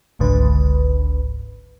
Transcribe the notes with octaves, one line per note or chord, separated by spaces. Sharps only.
G1 C#2 G#2 D3 B4